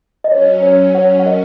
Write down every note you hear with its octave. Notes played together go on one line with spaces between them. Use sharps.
D#5
F#3 C#4 C#5
C#5
C#5 F#5
F#5
A#4 D#5